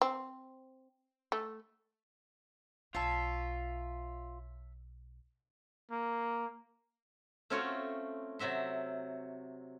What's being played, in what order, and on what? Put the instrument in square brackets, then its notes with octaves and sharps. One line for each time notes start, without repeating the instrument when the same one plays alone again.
[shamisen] C4
A3
[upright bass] B1 [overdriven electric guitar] F4 [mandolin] C#5 E5 A5
[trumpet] A#3
[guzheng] A3 C4 C#4 F4 F#4 C#5
C3 F#3 F#4 E5 C6